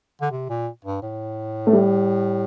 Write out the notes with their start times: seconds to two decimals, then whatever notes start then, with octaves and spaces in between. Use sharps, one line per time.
0.21 D3
0.31 C3
0.49 A#2
0.85 G2
1.02 A2
1.67 A3
1.73 G3